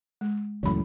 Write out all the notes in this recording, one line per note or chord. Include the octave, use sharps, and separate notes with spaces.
G#3
C#2 F#2 A2 E3 B5